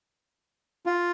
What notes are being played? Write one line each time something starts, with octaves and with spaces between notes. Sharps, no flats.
F4